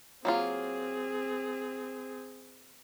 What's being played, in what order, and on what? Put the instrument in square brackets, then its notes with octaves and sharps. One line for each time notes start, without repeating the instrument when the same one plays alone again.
[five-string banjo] F#3 A#3 F4 [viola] C4 G#4